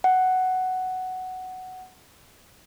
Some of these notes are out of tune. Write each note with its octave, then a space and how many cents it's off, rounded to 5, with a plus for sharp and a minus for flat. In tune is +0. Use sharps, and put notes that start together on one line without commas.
F#5 +5